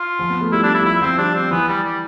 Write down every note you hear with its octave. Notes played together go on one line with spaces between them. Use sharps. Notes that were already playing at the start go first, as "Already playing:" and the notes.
Already playing: F4
F3
B3
A3
G3 E4
D4
E4
G3
F3 E4
F3 C4
G3 D4
C4
E3 B3
G3
G3